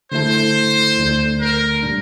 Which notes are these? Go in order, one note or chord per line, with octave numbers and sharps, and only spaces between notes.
D3 A3 E4 A4 C5
D2 D3 A3 D4
A#4
A#2 G3 D4